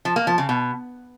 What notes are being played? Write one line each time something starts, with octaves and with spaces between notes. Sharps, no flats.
F3
A#3
F3
C#3
B2